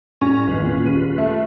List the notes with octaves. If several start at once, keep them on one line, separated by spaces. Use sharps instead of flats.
A2 G3 C#4 A#5
G#1 F3 F4 B4 D#5
E2 A#2
D#1 C#3 D#7
A3